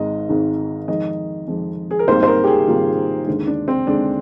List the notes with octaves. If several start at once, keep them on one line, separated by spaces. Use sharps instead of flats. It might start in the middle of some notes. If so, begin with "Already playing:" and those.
Already playing: G#1 G#2 D#3 G#3 D#5
G#1 G#2 D#3 G#3
F2 D#3 G#3 D#5
F2 D#3 G#3
G#4
A#4
G#1 G#2 D#3 G3 A#3 C5
C5
A#4
G4
G#4
G#1 G#2 D#3 G3 A#3 F4
D#2 D3 G#3
D4
C4
D#2 D3 G#3 D4